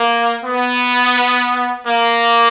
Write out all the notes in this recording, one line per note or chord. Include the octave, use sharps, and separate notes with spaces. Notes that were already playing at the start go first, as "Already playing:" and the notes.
Already playing: A#3
B3
A#3